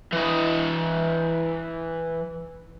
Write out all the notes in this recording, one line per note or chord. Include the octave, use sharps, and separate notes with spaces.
E3 D#5